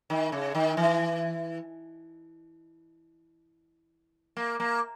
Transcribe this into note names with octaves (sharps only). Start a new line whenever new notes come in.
D#3
C#3
D#3
E3
A#3
A#3